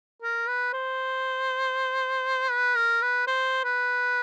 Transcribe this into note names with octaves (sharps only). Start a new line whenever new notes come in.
A#4
B4
C5
B4
A#4
B4
C5
B4